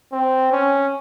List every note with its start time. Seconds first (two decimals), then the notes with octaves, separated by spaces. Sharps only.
0.12 C4
0.52 C#4